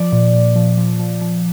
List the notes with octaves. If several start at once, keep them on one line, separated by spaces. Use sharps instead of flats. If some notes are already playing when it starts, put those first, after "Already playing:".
Already playing: F3 D5
A#2
A#2
F3
F3
F3
F3